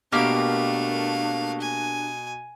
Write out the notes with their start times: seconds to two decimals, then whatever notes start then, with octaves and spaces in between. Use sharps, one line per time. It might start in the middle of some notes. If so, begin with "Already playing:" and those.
0.12 B2 A3 A#3 D4 G4 A#4 F5
1.60 G#5